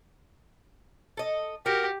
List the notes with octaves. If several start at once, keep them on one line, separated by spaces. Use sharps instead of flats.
A4 D#5
F#4 G4 A#4